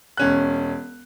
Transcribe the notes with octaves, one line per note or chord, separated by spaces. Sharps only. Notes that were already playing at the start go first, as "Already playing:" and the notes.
E1 C#4 F#6